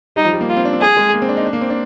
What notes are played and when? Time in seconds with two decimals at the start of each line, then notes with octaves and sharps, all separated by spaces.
0.16 G3 D#4
0.25 F3
0.33 G3
0.41 A#3
0.49 F4
0.57 C4
0.65 D4
0.73 C4
0.81 G#4
0.97 G#3
1.14 A#3
1.22 C4
1.29 D4
1.37 D#4
1.46 D4
1.53 A#3
1.61 C4
1.70 D4